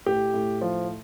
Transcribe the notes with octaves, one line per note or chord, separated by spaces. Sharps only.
A2 G4
A2
F3